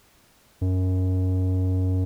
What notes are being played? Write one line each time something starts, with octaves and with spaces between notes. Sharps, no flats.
F#2